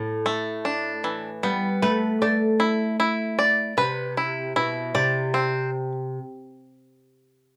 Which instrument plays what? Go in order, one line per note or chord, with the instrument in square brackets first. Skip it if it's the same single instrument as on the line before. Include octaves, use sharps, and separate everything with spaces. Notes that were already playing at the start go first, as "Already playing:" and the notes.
Already playing: [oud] A2
[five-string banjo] A3
D4
E3
[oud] G3 [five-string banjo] B3
[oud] A3 [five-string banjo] B4
[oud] A3 [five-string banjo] D5
[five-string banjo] E4
E4
D5
[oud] C3 [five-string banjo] B4
[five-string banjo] E4
[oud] B2 [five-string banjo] E4
[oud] C3 [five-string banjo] D5
[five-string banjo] C4